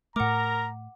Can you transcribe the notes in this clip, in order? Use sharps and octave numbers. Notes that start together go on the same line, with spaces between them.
A2 A3 A#4 F#5 A#5 D6